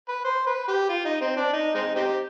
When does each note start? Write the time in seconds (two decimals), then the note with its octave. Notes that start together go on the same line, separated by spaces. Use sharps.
0.09 B4
0.25 C5
0.46 B4
0.68 G4
0.89 F4
1.05 D#4
1.21 C4
1.37 D4
1.53 D#4
1.75 G#3 C4 D#4
1.96 C4 D#4 G4